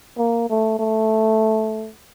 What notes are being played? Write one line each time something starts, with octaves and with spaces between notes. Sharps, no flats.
A#3
A3
A3